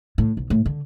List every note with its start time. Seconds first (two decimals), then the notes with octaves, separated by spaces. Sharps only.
0.18 A2
0.37 B1
0.50 A2
0.66 D3